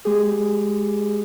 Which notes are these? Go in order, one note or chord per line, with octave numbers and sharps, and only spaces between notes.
G#3 G4 G#4